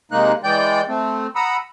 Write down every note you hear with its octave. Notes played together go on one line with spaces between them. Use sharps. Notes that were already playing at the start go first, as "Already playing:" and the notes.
C3 G#3 A#3 D#4 F#6
E3 G#3 D5 G5 G6
A3 C4
F#5 A#5 B5 D#6 E6